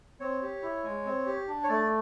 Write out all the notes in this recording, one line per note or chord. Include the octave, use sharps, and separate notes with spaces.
C4 C#5
G4
E4
G#3
C4
G4
D4
C#5
A3 D5